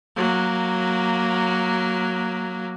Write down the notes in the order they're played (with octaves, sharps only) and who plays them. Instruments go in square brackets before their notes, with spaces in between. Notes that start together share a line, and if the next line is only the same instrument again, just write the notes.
[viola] F#3 A#3